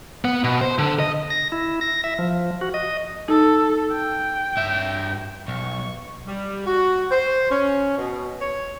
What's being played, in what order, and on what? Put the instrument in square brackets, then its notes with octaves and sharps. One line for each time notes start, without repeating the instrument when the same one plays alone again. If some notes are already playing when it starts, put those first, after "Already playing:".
[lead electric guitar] B3
B2
C5
D3
D#5
[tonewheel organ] A#6
E4
A#6
E5
F3
F#4
D#5
[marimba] D#4 [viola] A4
[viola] G5
[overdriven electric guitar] G2 E5
[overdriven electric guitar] B1 [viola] C#6
[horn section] G3
F#4
C5
C#4
B2
C#5